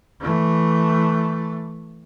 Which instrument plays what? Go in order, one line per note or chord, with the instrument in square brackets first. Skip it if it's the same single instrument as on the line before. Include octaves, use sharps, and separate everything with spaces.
[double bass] E3 A3